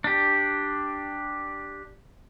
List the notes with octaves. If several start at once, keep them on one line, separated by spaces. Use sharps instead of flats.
D4 G4